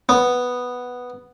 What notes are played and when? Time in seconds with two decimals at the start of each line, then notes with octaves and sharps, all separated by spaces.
0.09 B3